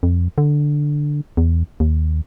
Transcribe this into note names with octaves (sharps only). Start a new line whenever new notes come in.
F2
D3
E2
D#2